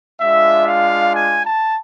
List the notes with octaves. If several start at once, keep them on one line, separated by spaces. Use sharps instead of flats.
G#3 D4 F4 E5
F5
G#5
A5